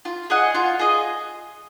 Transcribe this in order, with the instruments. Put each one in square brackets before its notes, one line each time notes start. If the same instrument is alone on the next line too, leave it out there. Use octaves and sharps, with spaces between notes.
[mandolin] F4
G#4 D#5 F#5
F4
G#4 D#5